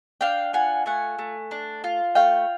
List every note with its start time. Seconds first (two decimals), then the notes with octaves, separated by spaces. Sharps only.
0.21 D4 F5 G5
0.53 F4 F#5 G#5
0.86 A3 F#5 G#5
1.19 A3
1.51 D4
1.84 F4
2.15 A3 F5 G5